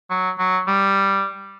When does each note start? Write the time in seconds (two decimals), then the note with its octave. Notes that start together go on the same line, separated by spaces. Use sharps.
0.10 F#3
0.39 F#3
0.67 G3